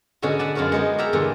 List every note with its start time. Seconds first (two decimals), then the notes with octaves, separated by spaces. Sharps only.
0.22 G#2 B2 D3 C#4 F#4
0.39 D5 F#5 A5 B5
0.55 F#2 F4 F#4 A#4 F#5
0.72 G#3 B3 D#4
0.98 A#4 D5 E5 F#5 G5 A#5
1.13 E2 G2 A#2 D3